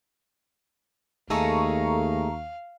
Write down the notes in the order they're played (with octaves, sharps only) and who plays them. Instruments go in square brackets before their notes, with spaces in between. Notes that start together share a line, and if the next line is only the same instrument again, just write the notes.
[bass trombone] D#2 [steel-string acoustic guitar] A3 D#4 G#4 [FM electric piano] A4 A#5 C#6 [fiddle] F5